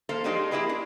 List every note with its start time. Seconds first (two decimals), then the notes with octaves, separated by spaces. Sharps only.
0.09 A#3 A4 C5 F5
0.24 F3 G#3 D4 D#4 G4 G#4
0.51 A#3 E4 G4 G#4 B4
0.69 D4